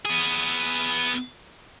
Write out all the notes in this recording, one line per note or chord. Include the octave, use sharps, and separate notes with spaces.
B3 G#4